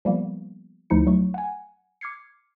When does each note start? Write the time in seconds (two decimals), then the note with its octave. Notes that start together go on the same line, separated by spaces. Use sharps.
0.05 F3 G3 A#3 B3
0.90 D2 F3 D#4 E4 C#7
1.07 F#3 A3 C#6
1.34 F#5 G#5
2.01 D6 F6 G#6 C7 C#7